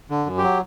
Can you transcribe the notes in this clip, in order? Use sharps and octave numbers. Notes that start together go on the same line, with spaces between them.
D3
F#2
G4
F#3